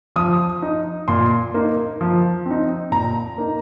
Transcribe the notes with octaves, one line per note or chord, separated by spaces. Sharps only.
F3 D#6
D#4
A#2 C6
A#3 D#4
F3
C4 D#4
A#2 A#5
A#3 D#4